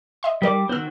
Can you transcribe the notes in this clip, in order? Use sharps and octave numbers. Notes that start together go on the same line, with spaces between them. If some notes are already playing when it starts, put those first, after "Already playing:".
D#5 E5 C6
G3 D#4 A#4 D5 D6
D#3 B3 F#4 C5 E6